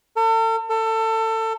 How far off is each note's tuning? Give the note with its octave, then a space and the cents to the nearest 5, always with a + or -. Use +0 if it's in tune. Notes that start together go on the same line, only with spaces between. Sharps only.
A4 +40
A4 +25